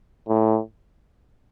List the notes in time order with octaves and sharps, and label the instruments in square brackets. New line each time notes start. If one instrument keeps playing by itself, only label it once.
[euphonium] A2